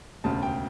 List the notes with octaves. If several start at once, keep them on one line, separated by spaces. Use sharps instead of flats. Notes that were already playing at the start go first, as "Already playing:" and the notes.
E1 D2 C#3 A5
G5